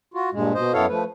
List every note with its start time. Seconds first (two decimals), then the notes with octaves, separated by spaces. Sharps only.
0.14 F4 F#4
0.33 G2 A#2 G#3
0.54 B2 C5 D#5
0.73 F#2 B3 E4 A4 C#5 F5
0.89 F3 A3 B4